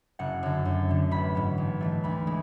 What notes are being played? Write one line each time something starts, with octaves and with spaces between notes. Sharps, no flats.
F#1 F#5
F#2 D3
F#2
D3 A3
A1 B5
G#2 F#3 B3
A1
G#2 E3 A3
D2 B5
G#3